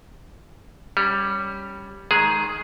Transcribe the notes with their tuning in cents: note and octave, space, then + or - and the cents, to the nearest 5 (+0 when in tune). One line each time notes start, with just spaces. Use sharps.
G3 +0 C#4 +0
D#3 +5 G#3 +20 G#4 +0